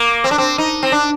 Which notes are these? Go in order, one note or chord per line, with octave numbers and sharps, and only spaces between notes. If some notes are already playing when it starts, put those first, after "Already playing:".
Already playing: A#3
C4
D4
C4
D#4
C4
D4